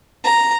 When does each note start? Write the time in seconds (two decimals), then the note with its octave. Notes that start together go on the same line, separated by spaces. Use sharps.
0.24 A#5